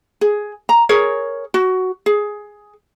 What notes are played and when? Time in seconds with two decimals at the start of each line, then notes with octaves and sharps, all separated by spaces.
0.21 G#4
0.69 A#5
0.89 G#4 A#4 C#5
1.54 F#4
2.06 G#4